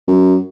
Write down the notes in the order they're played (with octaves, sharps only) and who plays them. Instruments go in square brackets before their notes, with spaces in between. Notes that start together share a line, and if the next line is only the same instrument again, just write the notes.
[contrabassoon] F#2